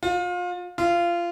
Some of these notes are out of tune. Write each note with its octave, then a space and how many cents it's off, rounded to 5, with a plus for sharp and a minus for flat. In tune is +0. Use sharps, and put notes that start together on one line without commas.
F4 +30
F4 -20